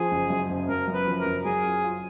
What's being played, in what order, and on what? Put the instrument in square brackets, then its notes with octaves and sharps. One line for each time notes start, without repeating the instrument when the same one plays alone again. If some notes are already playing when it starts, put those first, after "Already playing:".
Already playing: [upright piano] F3 [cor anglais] G#4
[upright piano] F#1
F#2
F#1
[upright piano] F#1 [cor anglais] A#4
[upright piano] F#2
[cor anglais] B4
[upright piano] F3
[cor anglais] A#4
[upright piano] F#1
[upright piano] F#3 [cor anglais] G#4
[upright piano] F4
F4